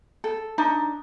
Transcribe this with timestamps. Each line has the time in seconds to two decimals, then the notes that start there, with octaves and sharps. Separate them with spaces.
0.24 A4
0.58 D4 D#4